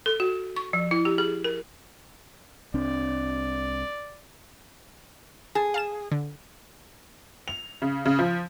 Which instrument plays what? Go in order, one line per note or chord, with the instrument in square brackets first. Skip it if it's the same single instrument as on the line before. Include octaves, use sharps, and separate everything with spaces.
[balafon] A4
F#4
C#6
F3
E4
G4
G#4
A#4
[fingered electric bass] C2 C4 D4 [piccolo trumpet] D5
[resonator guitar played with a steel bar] G#4 [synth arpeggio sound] A5
[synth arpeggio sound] F5 A5 E7
D3
[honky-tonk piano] F7
C#3
C#3
F3